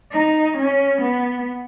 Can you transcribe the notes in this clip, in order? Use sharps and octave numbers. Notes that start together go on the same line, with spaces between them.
D#4
C#4
B3